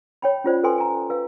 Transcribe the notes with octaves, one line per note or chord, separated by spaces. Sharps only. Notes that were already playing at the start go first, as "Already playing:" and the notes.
C#5 G5 B5
C#4 F4 C5 D5
A4 B4 G5 G#5 C6
G#5 A#5
B4 F5